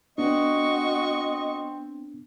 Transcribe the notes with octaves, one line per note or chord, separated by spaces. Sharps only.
B3 C4 D4 F#4 D#5 C#6